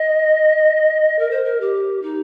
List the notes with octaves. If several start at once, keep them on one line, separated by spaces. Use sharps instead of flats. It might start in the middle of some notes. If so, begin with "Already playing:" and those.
Already playing: D#5
A#4
C5
A#4
G4
D#4